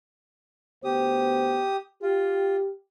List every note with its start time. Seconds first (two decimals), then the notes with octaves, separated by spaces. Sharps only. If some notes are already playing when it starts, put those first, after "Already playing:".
0.84 D2 B3 G4 C5 D#6
2.02 F4 G4